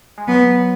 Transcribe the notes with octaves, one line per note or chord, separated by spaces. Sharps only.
G#3
F#3 B3